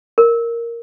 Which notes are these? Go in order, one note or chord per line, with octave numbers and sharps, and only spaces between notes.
A#4